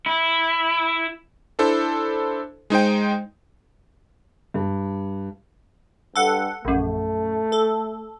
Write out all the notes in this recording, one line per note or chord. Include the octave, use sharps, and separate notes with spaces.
E4
D4 E4 A4 C5
G#3 D#4 C5 G5
G2
G2 A4 F#5
A#1 F#2 A3
A4